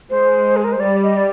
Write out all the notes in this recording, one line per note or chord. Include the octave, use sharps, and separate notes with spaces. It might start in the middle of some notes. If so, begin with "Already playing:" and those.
G#3 C5
G#4
A#4
C5
G3 D5
D#5
D5